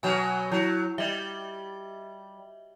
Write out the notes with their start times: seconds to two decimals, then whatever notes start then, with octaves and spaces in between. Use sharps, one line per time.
0.03 B2 F#3 G#5 B5 G6
0.52 F#3 E4
0.98 G3 D#5 E5